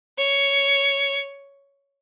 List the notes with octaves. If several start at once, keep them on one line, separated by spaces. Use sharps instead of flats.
C#5